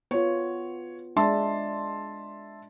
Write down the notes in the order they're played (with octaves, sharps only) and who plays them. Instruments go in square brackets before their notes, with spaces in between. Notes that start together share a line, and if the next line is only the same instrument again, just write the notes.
[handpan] B3 F4 [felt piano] C#5
[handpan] G#3 D4 [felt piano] E5 A5 C6